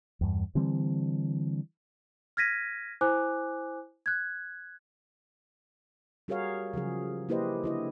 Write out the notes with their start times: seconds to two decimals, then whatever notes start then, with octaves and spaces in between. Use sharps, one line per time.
0.21 E2 G2
0.55 D3 E3 G3 C4
2.37 F6 G#6 A#6 B6 D#7
3.01 E4 C5 G#5 D6 F#6
4.06 F#6 G#6
6.28 G3 F#4 G#4 A#4 C#5 F5
6.74 C#3 F3 F#3 G#4
7.29 A#3 E4 G4 B4 C5 D#5
7.64 D3 E4 D#5